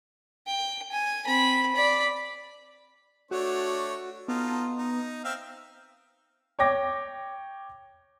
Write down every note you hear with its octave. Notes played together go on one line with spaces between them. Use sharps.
G5
G#5
C4 B5
D5 B5
A3 D4 F#4 C#5
B3 D#4 F4 A4
D#4
C4 E5 F5
C#5 G5 D6 A#6